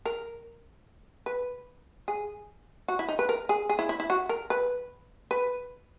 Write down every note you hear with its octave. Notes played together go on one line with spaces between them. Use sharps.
A#4
B4
G#4
F#4
E4
D#4
B4
A#4
G#4
G#4
E4
E4
E4
F#4
A#4
B4
B4